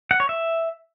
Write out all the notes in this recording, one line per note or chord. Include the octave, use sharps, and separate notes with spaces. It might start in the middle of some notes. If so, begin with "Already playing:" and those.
F#5
C#5
E5